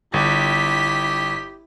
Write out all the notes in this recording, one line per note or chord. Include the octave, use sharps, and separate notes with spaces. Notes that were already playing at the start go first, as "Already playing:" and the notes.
G1 E4 G4 B6